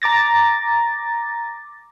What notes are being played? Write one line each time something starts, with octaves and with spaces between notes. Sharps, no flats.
A#5 D6 A6 A#6